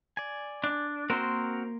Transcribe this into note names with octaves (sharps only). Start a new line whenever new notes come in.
D5 G#5
D4
A#3 C4 F#4 A#4 C6